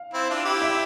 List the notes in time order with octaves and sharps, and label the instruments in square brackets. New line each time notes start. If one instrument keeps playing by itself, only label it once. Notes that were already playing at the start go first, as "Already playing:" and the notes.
Already playing: [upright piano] F5
[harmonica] C4 E4
D4 F4
E4 G4
[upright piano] E5